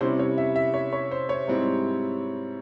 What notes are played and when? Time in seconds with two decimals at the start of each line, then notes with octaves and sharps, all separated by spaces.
0.01 C3 G3 C#4 E4 C5
0.20 C#5
0.38 E5
0.56 E5
0.74 C#5
0.93 C#5
1.11 C5
1.29 C#5
1.48 G#2 G3 C4 E4